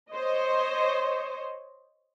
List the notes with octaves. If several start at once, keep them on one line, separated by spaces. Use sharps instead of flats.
C5 C#5 D#5